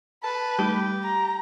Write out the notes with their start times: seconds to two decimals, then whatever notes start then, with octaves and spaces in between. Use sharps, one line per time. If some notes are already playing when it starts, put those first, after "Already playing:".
0.24 B4 A5
0.59 G3 A3 D#4 G4
1.04 A#5